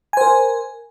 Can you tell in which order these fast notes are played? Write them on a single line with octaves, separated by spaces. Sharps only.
G#5 C5 A#4